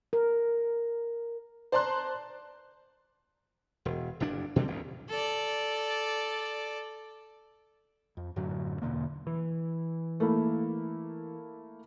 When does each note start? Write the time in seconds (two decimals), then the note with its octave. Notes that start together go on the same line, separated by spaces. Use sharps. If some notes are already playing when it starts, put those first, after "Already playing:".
0.13 A#4
1.72 C5 D5 A5 A#5 C6 F#6
3.85 E1
4.20 F#1 G2 D4
4.56 B2 D3 G3 C4
4.68 F#1 D2
5.10 A4 D5
8.17 F2
8.36 F#2 A2 D3 F#3
8.82 E2 B2 D3 A#3
9.27 E3
10.20 A3 A#3 E4